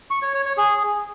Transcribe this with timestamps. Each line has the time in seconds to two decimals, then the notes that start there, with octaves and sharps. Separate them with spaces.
0.11 C#6
0.22 C#5
0.34 C#5
0.46 C#5
0.57 G#4